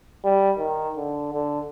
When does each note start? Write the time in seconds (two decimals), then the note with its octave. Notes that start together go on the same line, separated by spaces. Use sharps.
0.24 G3
0.59 D#3
0.97 D3
1.33 D3